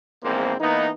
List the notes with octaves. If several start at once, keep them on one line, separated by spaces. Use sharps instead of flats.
A#1 E2 G#2 A#3 C4 C5
E3 A#3 B3 D#4